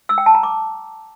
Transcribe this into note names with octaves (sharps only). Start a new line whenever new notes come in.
E6
G5
A5
A#5
D6